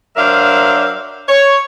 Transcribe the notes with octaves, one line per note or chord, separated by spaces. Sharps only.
F#3 D4 A#4 C5 E5 F5
C#5